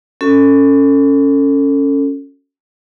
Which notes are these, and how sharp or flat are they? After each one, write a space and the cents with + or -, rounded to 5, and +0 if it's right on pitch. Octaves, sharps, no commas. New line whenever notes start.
C#4 +0 F#4 +0 A4 +25